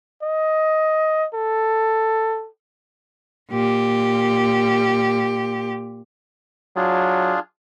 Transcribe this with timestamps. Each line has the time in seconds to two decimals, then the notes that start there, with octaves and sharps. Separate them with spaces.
0.23 D#5
1.34 A4
3.50 A#2 G4
6.76 F#3 D4 F4 G#4